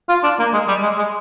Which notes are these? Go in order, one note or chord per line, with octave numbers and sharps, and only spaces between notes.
F4
D4
A#3
G#3
G3
G#3
G#3